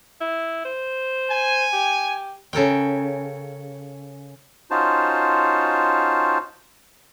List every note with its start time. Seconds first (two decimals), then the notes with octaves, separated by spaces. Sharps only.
0.21 E4
0.65 C5
1.31 G#5
1.73 G4
2.53 C#3 A4 A#4 G5
4.71 C#4 D#4 F4 F#4 C5 A5